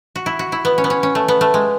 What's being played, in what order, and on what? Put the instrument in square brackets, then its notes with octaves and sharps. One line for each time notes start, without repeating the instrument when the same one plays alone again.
[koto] F#4
E4
F#4
E4
B3
C#4
B3
C#4
C#4
A3
B3
A3
G#3